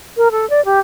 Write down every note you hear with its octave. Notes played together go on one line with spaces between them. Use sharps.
A#4
A4
D5
G4